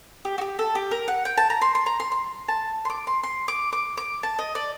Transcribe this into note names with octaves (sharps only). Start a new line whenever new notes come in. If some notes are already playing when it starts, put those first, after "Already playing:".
G4
F#4
G4
A4
G4
A#4
F#5
G5
A5
A#5
C6
C6
A#5
C6
C6
A5
C6
D6
C6
C6
D6
D6
D6
A5
D#5
D5